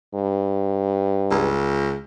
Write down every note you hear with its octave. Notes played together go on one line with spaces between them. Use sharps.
G2
C#2